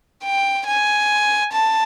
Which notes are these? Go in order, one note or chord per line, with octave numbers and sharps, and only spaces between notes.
G5
G#5
A5